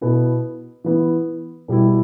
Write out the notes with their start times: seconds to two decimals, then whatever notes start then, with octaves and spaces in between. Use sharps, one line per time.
0.01 B2 B3 E4
0.84 E3 B3 E4
1.68 B2 G3 B3 E4